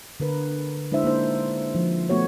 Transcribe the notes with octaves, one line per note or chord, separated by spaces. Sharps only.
D3 A#4 B4
G#3 D4 E4 C5 E5
A#3 D#4 C5
F3
A3 B3 F#4 C#5